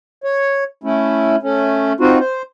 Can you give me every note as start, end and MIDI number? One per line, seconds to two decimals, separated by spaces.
0.24 0.64 73
0.84 1.36 57
0.84 1.36 61
0.84 1.36 64
1.43 1.93 57
1.43 1.93 61
2.00 2.18 60
2.00 2.18 63
2.00 2.18 65
2.00 2.18 66
2.19 2.42 72